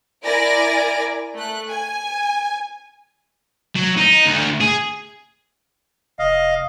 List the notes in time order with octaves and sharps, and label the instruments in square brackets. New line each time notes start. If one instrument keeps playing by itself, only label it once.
[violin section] E4 A#4 D5 G#5 A#6 D7
A3 F#6
G#5
[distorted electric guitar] F#3
D#4
D2
G#4
[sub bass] F1 [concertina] D#5 F5